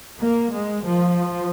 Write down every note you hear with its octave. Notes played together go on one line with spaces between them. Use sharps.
A#3
G#3
F3